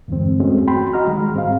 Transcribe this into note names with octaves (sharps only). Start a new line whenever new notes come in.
E2 G2 D3 E3 G#3 C4
G#3 A3 C4 C#4 F#4
F#4 G5 B5 C6
F#4 D#5 A#5 F6
D#3 G3 G#3
G#2 C4 G#4 F5